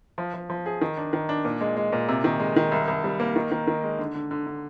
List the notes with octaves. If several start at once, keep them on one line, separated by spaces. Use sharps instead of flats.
F3
F3
F3
G#4
D#3
D4
D#3
D4
A#2
G#3
G#3
A#2
C3
D#3
G#3
D#3
C2
C2
G3
A#3
D#3
D#3
D#3
G#3
D3
D3
D3
D3